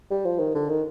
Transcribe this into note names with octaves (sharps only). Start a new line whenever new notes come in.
G3
F3
D#3
D3
D#3